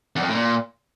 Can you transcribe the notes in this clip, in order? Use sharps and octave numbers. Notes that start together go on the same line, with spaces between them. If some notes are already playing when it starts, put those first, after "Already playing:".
E2
F2
A2
A#2